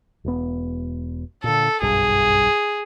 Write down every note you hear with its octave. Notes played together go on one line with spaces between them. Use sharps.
E1 B3
A#2 D3 A4
F#1 B1 G2 G#4